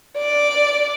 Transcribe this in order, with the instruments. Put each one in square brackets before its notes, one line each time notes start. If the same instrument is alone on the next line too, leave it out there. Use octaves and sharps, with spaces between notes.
[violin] D5